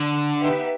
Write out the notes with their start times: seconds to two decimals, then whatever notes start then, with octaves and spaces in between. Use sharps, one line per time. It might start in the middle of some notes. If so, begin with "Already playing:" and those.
Already playing: D3
0.40 B3 D#4 G4 B4 E5